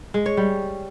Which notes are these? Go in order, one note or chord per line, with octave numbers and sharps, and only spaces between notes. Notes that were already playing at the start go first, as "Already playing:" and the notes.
G#3
C#5
G3